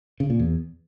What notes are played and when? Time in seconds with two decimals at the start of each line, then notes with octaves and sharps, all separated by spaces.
0.20 C#3
0.30 A#2
0.40 E2